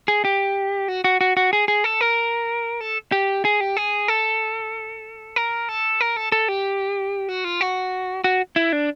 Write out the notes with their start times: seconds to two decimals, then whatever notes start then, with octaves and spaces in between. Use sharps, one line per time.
0.08 G#4
0.25 G4
0.88 F#4
1.04 F#4
1.21 F#4
1.37 F#4
1.53 G#4
1.68 G#4
1.84 A4
2.01 A#4
2.81 A4
3.12 G4
3.45 G#4
3.60 G4
3.77 G#4
4.08 A4
5.36 A#4
5.69 A4
6.01 A#4
6.16 A4
6.32 A4
6.49 G4
7.29 F#4
7.44 F4
7.61 F#4
8.24 F#4
8.56 E4
8.73 D4